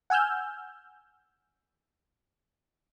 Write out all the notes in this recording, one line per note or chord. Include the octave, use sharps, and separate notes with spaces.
F#5 G#5 E6 F6 G6